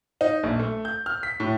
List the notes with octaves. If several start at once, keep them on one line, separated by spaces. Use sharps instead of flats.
D#4
A#1
A3
G6
F6
B6
A2